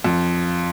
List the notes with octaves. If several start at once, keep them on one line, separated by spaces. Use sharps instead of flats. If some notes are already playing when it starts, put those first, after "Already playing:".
F2